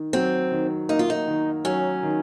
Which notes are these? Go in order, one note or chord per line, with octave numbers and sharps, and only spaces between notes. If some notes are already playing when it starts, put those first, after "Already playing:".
Already playing: D#3
F#3 C4
D#3
A#3 D#4
F4
D#4
D#3
F#3 C#4
D#3